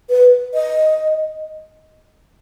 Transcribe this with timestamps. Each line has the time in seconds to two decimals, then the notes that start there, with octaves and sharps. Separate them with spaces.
0.10 B4
0.54 D#5